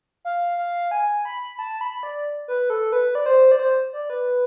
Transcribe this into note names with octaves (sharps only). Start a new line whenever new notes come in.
F5
F5
G#5
B5
A5
B5
D5
B4
A4
B4
D5
C5
D5
C5
D5
B4